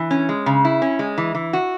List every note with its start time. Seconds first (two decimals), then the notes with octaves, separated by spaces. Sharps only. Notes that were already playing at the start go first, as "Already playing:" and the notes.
Already playing: E3
0.11 C#4
0.29 G#3
0.46 C#3
0.65 E4
0.82 C#4
0.99 G#3
1.18 E3
1.35 E3
1.53 F#4